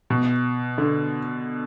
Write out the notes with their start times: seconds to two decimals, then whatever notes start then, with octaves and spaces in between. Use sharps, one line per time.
0.10 B2
0.78 D3